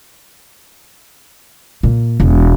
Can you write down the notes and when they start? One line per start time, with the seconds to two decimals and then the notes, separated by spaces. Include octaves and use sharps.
1.83 A#2
2.20 E1